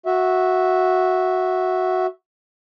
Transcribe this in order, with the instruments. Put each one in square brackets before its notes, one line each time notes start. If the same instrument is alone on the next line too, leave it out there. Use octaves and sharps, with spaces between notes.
[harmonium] F#4 E5